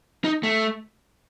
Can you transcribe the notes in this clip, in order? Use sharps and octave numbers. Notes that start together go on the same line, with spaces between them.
D#4
A3